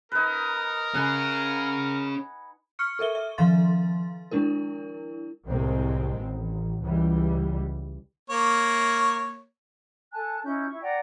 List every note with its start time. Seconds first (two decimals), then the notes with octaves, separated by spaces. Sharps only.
0.12 D#4 A#4 B4
0.94 C#4 G#4 F#5 G#5 B5
2.79 C#6 F6 C#7
2.99 A4 A#4 E5 G7
3.15 E5
3.38 D#3 F3 F5 C6 A6
4.31 G#3 D4 E4 A#4
5.47 C2 A2 D#3 G#3 C4
6.17 A1
6.84 C#2 E3 G3
8.30 A#3 C#5
10.12 A4 G#5 A5 F#6
10.43 C#4 D#4 E4 G6
10.69 E4 C#6
10.81 D5 F#5 G5 A#5